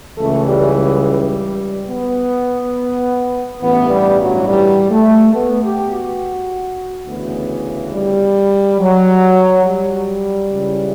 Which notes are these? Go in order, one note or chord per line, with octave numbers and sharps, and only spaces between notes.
C#2 C#3 E3 A3
G3
G3
B3
A1 G2 E3 B3
G3
F#3
G3
A3
B3
G4
F#4
D2 C#3 E3 B3
G3
F#3
G3
C#2 C#3 E3